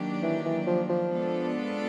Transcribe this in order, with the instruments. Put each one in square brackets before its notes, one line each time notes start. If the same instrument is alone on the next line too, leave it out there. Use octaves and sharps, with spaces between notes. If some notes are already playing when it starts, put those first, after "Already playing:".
Already playing: [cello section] D#3 F#3 A#3 D4 G4
[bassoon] E3
E3
F3
F3
[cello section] G#3 B3 D4 F4 A4